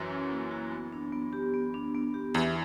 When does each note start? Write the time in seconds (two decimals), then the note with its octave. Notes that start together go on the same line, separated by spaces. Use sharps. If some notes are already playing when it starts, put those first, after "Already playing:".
Already playing: F#2 E3 F#3
0.10 C#4
0.31 A#3
0.51 F#4
0.72 B3
0.92 D4
1.13 B3
1.33 G4
1.53 B3
1.74 D4
1.94 B3
2.14 G4
2.34 E2 E3 E5